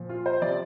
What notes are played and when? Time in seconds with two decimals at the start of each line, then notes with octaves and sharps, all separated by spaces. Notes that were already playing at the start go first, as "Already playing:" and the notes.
Already playing: A#2 F3
0.09 F4
0.26 C5
0.41 C3 F3 D5